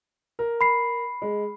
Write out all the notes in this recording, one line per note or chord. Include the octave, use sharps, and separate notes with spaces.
A#4
B5 C7
G#3